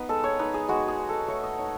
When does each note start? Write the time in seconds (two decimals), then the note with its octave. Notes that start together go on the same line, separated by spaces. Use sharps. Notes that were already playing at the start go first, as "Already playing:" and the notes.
Already playing: B3 D#4 B4
0.09 G#3 A4
0.24 C#5
0.39 D#4 B4
0.54 G#4
0.69 G#3 F#4
0.88 G#4
0.99 D#4
1.09 A4
1.28 A3 C#5
1.44 D#5
1.58 D#4 C#5